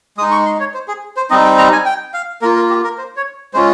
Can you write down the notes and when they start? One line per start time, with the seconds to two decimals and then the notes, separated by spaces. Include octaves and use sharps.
0.17 G#3 D#6
0.22 D#4
0.31 C#6
0.46 C6
0.60 C#5
0.74 C5
0.88 G#4
1.17 C5
1.30 G3 C4 D#4 D#5
1.44 G5
1.58 A#5
1.73 G#5
1.86 G5
2.14 F5
2.41 A#3 F4 A#4
2.56 A#4
2.70 G4
2.84 A#4
2.98 C5
3.16 C#5
3.53 G#3 C#4 F4 C5